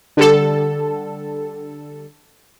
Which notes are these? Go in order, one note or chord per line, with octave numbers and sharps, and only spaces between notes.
D3 G3 A4